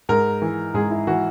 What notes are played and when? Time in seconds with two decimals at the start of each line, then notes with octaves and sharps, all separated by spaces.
0.09 G#2 A#4
0.42 E3
0.74 G#2 G#4
0.90 E4
1.07 E3 F#4